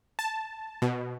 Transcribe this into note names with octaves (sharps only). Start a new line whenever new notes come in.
A5
B2